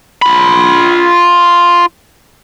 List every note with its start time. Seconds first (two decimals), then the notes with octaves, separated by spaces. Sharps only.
0.22 F4 B5